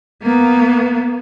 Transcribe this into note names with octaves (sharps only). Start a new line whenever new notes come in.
A#3 B3